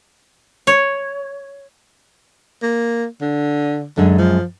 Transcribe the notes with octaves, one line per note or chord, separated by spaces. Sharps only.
C#5
A#3
D3
F#2 D3 G#3
F3